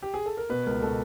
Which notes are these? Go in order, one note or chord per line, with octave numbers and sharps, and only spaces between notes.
G4
G#4
A4
A#4
B2 B4
C#2 A#4
B2 A4